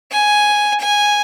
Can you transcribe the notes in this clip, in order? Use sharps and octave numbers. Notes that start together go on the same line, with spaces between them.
G#5
G#5